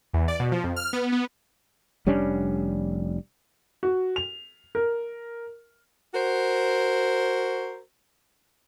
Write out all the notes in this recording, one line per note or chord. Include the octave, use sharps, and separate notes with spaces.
E2
D5
B2
F3
F2
F6
B3
B3
F1 G3 C#4 D4
F#4
F7
A#4
F#4 A#4 C5